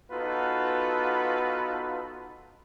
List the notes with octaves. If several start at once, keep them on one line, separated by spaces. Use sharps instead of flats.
B3 D#4 F4 F#4 A4 B4